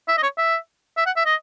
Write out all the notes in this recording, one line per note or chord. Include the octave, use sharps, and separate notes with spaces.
E5
D#5
C#5
E5
E5
F#5
E5
D#5